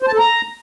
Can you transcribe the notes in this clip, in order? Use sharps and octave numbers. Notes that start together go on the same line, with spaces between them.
C5
A5
A4
A#5